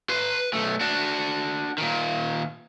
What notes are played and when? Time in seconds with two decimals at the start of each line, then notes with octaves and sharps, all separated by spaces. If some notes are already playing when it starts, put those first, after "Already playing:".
0.09 B4 C6
0.53 B1 A3
0.81 D4 F#4
1.78 A#2 D#3